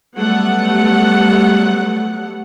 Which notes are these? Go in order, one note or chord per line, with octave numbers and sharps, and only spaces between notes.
F#3 G3 A3 B3 F#5